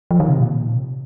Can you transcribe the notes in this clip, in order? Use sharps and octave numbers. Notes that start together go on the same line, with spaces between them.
F3
D#3
C3
A#2
C3